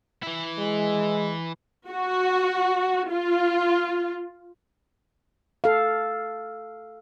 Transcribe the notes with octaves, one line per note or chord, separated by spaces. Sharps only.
E3 E4
G#3
F#4
F4
A4 F5